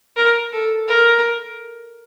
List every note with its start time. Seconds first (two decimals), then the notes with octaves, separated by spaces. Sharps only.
0.17 A#4
0.53 A4
0.88 A#4